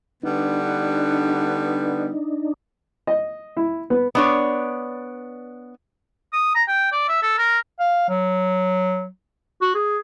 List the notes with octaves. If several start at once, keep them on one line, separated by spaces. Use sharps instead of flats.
D3 G3 B3 D4 D#4
D#5
E4
B3
B3 D4 C#5
D#6
A#5
G5
D5
E5
A4
A#4
F5
F#3
F#4
G#4